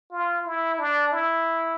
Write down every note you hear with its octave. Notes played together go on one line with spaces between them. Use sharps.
F4
E4
D4
E4